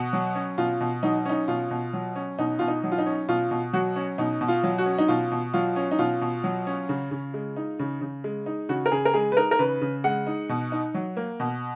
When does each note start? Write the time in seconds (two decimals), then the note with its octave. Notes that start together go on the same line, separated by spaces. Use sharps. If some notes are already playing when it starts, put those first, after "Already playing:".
Already playing: B2 F#4
0.13 F#3
0.35 C#4
0.58 B2 F4
0.81 B2
1.03 F#3 D#4
1.25 C#4 D#4
1.48 B2 F4
1.70 B2
1.93 F#3
2.16 C#4
2.38 B2 D#4
2.59 B2 F4
2.68 D#4
2.84 F#3
2.92 F4
2.98 D#4
3.06 C#4
3.28 B2 F4
3.51 B2
3.73 F#3 F#4
3.96 C#4
4.18 B2 D#4
4.41 B2
4.48 F4
4.63 F#3
4.78 F#4
4.86 C#4
4.98 D#4
5.08 B2 F4
5.32 B2
5.54 F#3 F4
5.76 C#4
5.91 D#4
5.99 B2 F4
6.21 B2
6.44 F#3
6.67 C#4
6.89 C#3
7.11 C#3
7.34 G#3
7.56 D#4
7.79 C#3
8.01 C#3
8.24 G#3
8.46 D#4
8.69 C#3 F#4
8.86 A#4
8.92 C#3 G#4
9.05 A#4
9.14 G#3 G#4
9.32 B4
9.37 D#4 A#4
9.51 A#4
9.59 C#3 B4
9.81 C#3
10.04 G#3 F#5
10.27 D#4
10.49 B2
10.72 D#4
10.94 F#3
11.17 A#3
11.40 B2